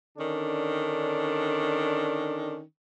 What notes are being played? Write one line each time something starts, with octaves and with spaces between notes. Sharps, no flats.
D3 D#3 C#4 D4